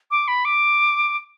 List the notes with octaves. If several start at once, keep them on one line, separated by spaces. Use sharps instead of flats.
D6
B5
D6